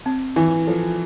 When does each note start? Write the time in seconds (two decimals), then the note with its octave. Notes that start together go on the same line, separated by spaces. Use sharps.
0.06 C4
0.36 E3 E4
0.67 F3 A4